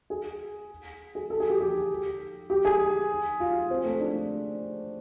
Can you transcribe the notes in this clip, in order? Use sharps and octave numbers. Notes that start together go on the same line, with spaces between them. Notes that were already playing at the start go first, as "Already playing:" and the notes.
G#4
G#4
A4
G#4
G4
G4
G4
G#4
F4
C4
A3
D4